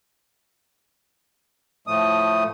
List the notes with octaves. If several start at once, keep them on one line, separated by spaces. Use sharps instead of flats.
A2 F3 A3 D#6